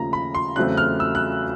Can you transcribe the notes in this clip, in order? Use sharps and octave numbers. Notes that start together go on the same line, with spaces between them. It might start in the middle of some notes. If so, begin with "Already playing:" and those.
Already playing: D#2 C#3 F3 A3 A#5
B5
C6
E2 C#3 F#3 A3 C4 F#6
F6
E6
F#6